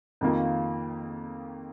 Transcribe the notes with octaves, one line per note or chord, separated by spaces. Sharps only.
F2 D#3 A#3 F4